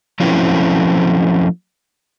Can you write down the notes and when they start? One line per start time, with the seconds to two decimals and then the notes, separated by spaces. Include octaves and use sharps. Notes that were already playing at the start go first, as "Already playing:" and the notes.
0.20 F3 F#3 A3 C4 C#4 E4